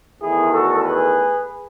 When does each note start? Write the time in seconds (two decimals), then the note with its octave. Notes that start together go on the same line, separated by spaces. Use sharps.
0.20 E2 D#3 A3 E4 G#4
0.51 F#4 A4
0.83 G#4 B4